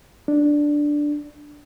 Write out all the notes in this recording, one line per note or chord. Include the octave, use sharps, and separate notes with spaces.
D4